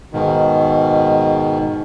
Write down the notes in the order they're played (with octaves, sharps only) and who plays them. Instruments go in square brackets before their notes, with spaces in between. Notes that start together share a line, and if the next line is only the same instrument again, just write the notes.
[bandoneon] G#2 B2 D#3